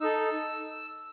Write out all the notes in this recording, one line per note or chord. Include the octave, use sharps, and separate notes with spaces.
D#4 A4 E6